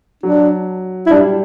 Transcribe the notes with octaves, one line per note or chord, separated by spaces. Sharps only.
F#3 D4
E4
G3 D4